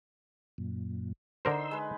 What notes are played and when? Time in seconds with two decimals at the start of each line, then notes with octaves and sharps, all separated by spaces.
0.58 F#2 A#2
1.45 D3 D#4 A4 A#4 C5 C6 E6
1.71 G#3 B4